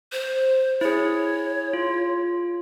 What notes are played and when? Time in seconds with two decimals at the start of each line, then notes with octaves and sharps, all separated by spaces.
0.12 C5
0.81 E4 G#4 C#5
1.73 F4